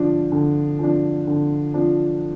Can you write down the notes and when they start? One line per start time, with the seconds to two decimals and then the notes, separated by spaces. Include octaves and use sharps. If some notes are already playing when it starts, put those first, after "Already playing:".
Already playing: D3 F3 D4
0.32 D3
0.79 F3 D4
1.27 D3
1.74 F3 D4